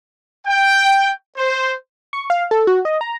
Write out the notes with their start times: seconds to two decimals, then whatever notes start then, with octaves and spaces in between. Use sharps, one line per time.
0.47 G5
1.37 C5
2.13 C#6
2.30 F5
2.51 A4
2.67 F#4
2.85 D#5
3.01 A#5